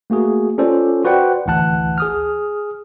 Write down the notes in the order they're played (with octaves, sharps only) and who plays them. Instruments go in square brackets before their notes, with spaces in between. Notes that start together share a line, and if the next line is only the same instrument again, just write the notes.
[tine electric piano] A3 A#3 F#4 G#4
C#4 F4 G4 A4 C5 D5
F#4 B4 C5 D5 F#5 G5
A1 D2 E3 F#5 A5 F#6
G#4 D#6 F6